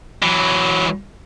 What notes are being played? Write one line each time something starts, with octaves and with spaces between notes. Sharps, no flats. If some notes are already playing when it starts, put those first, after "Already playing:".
E3 F#3